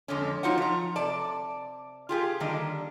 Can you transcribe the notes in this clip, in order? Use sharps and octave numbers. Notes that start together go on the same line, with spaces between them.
F2 D3 G#3 C#4
F#3 D#4 F4 F#4 C5 F#5
F3 A#5
C3 D5 A5
F4 G4 G#4
D3 D#3 G3 A#3 D4